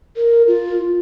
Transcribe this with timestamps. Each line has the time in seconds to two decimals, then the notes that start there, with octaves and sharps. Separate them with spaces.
0.17 A#4
0.47 F4